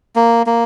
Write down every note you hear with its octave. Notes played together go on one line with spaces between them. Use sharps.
A#3
A#3